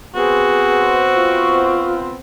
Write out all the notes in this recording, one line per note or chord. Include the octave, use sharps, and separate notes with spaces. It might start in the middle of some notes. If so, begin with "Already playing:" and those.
B3 C4 F#4 G#4 B4
F4 C#6